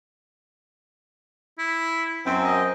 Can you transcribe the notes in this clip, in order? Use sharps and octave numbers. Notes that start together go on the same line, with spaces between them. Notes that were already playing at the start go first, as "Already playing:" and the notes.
E4
F#2 C4
D#5